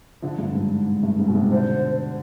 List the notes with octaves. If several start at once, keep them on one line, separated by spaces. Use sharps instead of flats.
D3 F3
G2
G#2
G#2
G2
G#2
B2
G#2 C3
B2 D3 C5